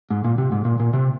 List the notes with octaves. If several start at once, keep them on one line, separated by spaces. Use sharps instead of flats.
G#2
A#2
C3
G#2
A#2
A#2
C3